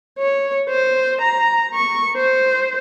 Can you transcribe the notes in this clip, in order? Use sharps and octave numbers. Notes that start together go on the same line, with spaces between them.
C#5
C5
A#5
C#6
C5